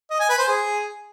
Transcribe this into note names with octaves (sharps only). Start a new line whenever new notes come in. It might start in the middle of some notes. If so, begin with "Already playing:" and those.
D#5
G#5
B4
C5
G#4